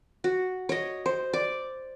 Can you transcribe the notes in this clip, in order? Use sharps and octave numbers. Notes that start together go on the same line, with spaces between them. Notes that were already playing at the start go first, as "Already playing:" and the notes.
F#4
C#5 D#5
C5
D5